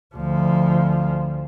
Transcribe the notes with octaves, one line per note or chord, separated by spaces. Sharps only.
D2 F3